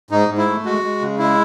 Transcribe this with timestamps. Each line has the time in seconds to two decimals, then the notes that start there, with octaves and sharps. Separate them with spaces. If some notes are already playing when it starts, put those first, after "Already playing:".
0.11 G#2 D#4
0.29 G#2
0.37 E4
0.47 A3
0.64 G#3 F#4
0.84 G#3
1.01 C#3
1.19 G#3 E4